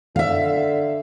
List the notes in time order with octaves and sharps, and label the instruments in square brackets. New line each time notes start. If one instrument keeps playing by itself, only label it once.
[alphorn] D3 [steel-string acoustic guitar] E5 F5